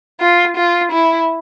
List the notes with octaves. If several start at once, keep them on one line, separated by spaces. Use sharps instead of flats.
F4
F4
E4